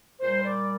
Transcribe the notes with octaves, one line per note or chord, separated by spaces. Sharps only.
A#2 G3 C5
D5